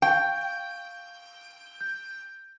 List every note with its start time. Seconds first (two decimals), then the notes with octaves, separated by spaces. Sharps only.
0.02 F5 G5 C#6 G6
1.81 G6